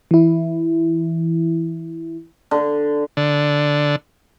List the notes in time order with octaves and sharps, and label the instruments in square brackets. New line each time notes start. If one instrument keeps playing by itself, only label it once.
[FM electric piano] E3 E4
[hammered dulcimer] D3
[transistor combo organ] D3